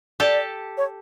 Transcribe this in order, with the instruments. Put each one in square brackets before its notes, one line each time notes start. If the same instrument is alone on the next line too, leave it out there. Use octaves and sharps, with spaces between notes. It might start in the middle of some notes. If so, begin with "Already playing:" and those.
[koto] G4 A4 [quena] D5
[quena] C#5